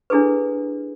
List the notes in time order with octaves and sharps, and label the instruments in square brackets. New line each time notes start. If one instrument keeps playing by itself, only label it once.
[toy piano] D4 E4 G#4 A4 B4